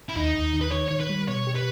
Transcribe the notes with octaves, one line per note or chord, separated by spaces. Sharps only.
E4
D#2 D#4
D#2
D#3
B4
D#3 C#5
D#3 C#5
B4
G3
B2 C#5
G4
B4